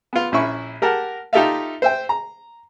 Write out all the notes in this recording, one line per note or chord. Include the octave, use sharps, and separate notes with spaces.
B3 F4
A#1 C#4 E4 E5 C#6
G4 A#4 F#5 A5
D#4 F4 G4 A4 E5 F5
C5 E5 G5
A#5